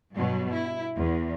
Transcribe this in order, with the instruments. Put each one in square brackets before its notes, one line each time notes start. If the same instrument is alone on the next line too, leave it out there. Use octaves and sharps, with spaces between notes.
[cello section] G2 B2 F#3
E4
E2